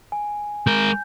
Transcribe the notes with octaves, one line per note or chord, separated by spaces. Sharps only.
G#5
G#3 A#4 G6